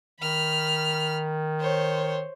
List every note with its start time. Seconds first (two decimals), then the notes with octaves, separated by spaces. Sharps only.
0.21 D#3 B5 F6
1.60 C5 C#5